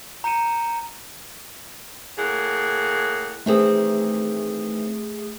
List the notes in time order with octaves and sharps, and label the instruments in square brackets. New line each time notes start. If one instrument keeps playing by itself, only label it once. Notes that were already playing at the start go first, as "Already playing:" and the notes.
[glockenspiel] A#5 G6 C#7 D#7 E7
[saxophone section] A2 A#3 G#4 F#5
[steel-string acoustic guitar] D#3 E3 C4 [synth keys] A3 G#4